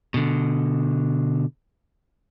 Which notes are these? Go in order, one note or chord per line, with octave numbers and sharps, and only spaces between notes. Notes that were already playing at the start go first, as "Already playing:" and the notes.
B2 D3